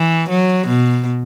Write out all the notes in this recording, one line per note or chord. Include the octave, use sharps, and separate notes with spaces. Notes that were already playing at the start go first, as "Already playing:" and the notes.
Already playing: E3
F#3
B2